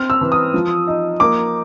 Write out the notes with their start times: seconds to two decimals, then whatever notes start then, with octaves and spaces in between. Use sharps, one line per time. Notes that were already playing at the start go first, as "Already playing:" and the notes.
Already playing: C4 F6
0.10 E6
0.21 E3
0.32 D#6
0.54 F3
0.87 D#4
1.20 A#3 D6